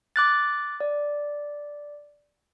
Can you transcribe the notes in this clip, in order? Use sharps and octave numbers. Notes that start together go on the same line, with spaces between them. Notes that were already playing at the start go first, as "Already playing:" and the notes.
D6 F#6 A6
D5